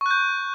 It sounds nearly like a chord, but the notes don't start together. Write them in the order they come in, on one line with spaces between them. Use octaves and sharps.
C#6 F#6 G6